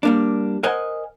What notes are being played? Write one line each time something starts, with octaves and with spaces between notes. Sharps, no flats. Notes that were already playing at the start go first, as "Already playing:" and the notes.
G3 A#3 D4
A#4 C5 D#5 F#5 G#5